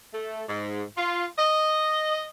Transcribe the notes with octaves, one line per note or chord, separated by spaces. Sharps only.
A3
G#2
F4
D#5